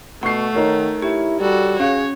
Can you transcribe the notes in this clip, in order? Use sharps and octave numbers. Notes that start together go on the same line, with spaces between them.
B2 A3 F#5 C#6 C7
D#3 D#4 A#4 C#5
E4 G4
G3 F#4 A4
C#4 G#4 C#5 F5